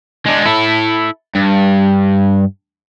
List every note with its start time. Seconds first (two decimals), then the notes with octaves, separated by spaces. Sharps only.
0.26 G#3 D4
0.45 E4 A4
1.35 G2